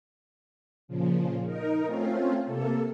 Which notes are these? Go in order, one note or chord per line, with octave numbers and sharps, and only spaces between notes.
A#2 C#3 F3
D#4 A#4
A3 C4 C#4 F4
C3 A#3 A4